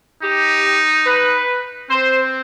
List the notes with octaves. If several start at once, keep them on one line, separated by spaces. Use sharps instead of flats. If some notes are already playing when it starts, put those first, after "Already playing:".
D#4 G4
B4
C4 C5